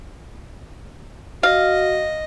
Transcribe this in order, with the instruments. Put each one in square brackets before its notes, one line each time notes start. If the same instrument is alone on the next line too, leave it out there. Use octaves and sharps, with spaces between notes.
[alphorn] F#4 [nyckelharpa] D#5 [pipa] F5